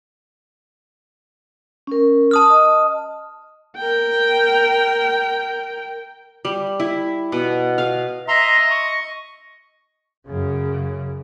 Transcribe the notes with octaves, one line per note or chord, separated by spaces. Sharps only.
C#4 A#4
A5 D#6 F6
D#5
A#4 G5
G3
E4
B2
F5
D#5 E5 A#5 C6
C#6
F#2 C#3